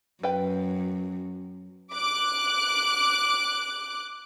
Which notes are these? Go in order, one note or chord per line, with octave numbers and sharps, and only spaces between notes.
F#2 B4 G5
D6 F#6